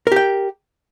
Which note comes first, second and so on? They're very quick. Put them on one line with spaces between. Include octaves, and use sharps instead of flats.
A#4 G4 G5